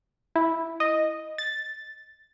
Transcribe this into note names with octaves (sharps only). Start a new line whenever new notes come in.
E4
D#5
A6